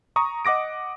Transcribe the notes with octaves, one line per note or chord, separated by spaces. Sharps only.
A#5 C#6 D#6
D#5 F#5 D6 A#6 D7